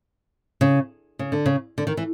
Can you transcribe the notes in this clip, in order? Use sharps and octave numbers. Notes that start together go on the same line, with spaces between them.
C#3
C#3
D3
C#3
D3
D#3
E3